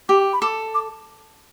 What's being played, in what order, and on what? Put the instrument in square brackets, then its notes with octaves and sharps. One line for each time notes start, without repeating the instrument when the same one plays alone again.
[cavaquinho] G4 [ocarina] D6
[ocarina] B5
[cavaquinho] A4 [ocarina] D6
[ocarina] D6